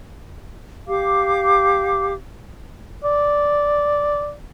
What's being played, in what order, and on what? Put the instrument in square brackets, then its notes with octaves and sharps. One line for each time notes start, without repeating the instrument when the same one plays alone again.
[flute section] G4 F5 D6
[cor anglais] D5